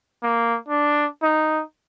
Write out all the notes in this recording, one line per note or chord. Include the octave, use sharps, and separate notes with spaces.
A#3
D4
D#4